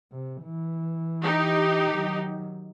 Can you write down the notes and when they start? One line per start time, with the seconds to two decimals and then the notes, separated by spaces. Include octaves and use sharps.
0.12 C3
0.43 E3
1.24 D#4 G4
1.90 D#3 F#3